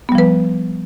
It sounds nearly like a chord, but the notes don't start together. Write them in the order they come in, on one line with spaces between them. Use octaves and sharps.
B3 G3 F3 B4